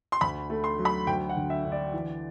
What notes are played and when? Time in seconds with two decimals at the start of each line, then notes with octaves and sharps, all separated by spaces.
0.12 C6
0.21 D2 B5
0.50 A3
0.64 C6
0.78 F#3
0.85 B5
1.07 D2 G5
1.29 F#5
1.37 D3
1.50 E5
1.65 D3
1.72 D5
1.93 E3